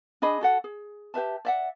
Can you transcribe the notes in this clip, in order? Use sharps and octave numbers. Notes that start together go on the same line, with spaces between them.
D4 G#4 D#5 B5
F#4 A4 F#5
G#4
G4 B4 E5 A5
D5 E5 F#5